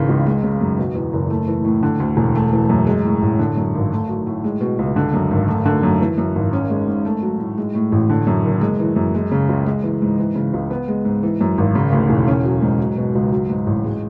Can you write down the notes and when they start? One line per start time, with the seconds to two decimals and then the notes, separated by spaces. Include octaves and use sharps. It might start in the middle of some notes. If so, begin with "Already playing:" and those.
Already playing: G#1 C#3 E3
0.09 C#2
0.26 G#3
0.44 C#3
0.60 F#2
0.78 B2
0.95 E2
1.13 F#1
1.30 A3
1.48 E3
1.65 A2
1.83 D3
2.00 D2
2.17 E1
2.35 A3
2.53 E3
2.69 F#2
2.87 G#3
3.05 A2
3.22 A1
3.39 D3
3.57 F#2
3.75 G#1
3.92 A3
4.09 F#3
4.27 A2
4.44 G#3
4.61 B2
4.79 C#2
4.96 D3
5.14 F#2
5.31 G#1
5.48 A3
5.66 D3
5.83 F#2
6.01 E3
6.18 F#2
6.35 G#1
6.53 C#4
6.70 G#3
6.88 G#2
7.05 A3
7.22 F#3
7.40 A2
7.58 G#3
7.75 A2
7.92 A1
8.10 D3
8.27 F#2
8.44 F#1
8.61 G#3
8.79 E3
8.96 F#2
9.15 G#3
9.32 C#3
9.49 C#2
9.66 G#3
9.83 E3
10.02 G#2
10.18 E3
10.35 C#3
10.53 C#2
10.71 B3
10.88 G#3
11.05 G#2
11.23 E3
11.41 F#2
11.58 G#1
11.75 C#3
11.92 D2
12.09 E1
12.28 C#4
12.45 F#3
12.62 G#2
12.79 F#3
12.97 B2
13.15 C#2
13.32 F#3
13.50 G#2
13.67 A1
13.84 G#3